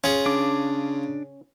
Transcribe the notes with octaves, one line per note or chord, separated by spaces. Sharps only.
C#4 F4 G#4
C#3 D4 D6